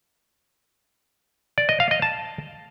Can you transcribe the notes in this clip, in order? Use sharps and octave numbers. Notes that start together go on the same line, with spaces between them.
D5
D#5
F5
D#5
A5